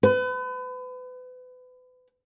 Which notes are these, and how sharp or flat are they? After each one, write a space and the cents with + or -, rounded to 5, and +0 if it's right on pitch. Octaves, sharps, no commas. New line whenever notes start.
B4 +35